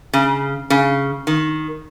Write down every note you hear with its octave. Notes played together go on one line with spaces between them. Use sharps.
C#3
C#3
D#3